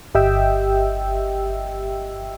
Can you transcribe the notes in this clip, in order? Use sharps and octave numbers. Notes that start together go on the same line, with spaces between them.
G1 G4 D#5 E5 G5 E6